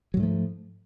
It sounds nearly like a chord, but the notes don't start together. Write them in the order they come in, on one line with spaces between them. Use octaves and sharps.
F#3 G#2 A3 F3